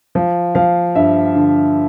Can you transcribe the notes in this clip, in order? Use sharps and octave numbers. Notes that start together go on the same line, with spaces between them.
F3
F3 F5
G2 E5
D3